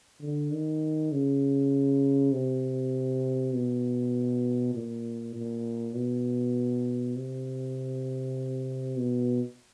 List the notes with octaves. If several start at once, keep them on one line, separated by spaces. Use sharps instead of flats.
D3
D#3
C#3
C3
B2
A#2
A#2
B2
C3
B2